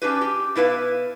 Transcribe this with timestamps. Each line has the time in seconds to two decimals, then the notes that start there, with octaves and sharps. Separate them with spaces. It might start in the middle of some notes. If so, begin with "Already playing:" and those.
0.02 C#4 D4 G4 B4
0.21 G4
0.55 B2 E4 B4 F5